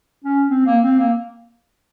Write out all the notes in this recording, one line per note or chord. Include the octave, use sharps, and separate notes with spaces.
C#4
C4
A#3
C4
A#3